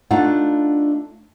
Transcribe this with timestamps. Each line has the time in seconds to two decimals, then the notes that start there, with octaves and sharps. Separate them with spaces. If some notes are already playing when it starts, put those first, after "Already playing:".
0.11 A3 D4 D#4 F4 F#5